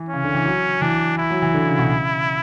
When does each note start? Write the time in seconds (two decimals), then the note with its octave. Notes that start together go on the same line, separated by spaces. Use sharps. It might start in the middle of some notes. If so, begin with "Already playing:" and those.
Already playing: E3
0.09 C#3 C#4
0.24 D3
0.34 E3
0.45 F#3
0.81 E3 D4
1.18 E4
1.30 F#3
1.42 E3
1.54 D3
1.67 C#3
1.78 B2
1.91 C#3